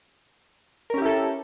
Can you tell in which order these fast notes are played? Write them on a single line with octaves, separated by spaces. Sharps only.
A#4 C#4 G4 E4 A4